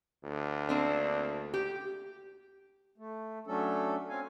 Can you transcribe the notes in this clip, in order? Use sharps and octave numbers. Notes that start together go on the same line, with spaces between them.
D2
A#3 C4 D4
G4
A3
F#3 A3 C#4 D4 A4
C4 C#4 F5 G#5